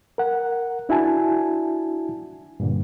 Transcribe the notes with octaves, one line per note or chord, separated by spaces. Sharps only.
A#4 F#5
D4 E4 F#4 G#5 A5
G2 A#2 D3